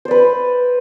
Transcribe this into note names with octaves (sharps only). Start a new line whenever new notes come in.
B4 C5 D5